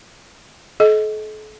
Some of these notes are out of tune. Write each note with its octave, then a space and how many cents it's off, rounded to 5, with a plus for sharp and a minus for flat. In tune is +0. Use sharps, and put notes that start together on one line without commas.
A4 -40 D#5 +20